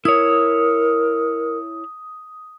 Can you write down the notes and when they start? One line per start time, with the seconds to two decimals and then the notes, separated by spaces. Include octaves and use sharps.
0.05 E4 A#4 C#5 D#6